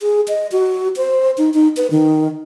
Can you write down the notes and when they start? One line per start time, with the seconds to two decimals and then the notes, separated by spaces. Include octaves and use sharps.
0.01 G#4
0.28 D#5
0.52 F#4
0.97 C5
1.38 D#4
1.54 D#4
1.77 B4
1.91 D#3